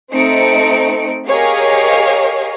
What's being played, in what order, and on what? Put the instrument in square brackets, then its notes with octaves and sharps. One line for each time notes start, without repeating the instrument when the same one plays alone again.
[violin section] A3 C4 D#4 C#7 D7
G4 G#4 A#4 C#5 D#5 F5